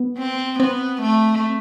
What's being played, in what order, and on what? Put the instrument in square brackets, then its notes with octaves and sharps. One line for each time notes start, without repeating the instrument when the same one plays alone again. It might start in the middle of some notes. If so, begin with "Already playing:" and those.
Already playing: [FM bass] B3
[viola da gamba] C4
[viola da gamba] B3 [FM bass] C4
[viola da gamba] A3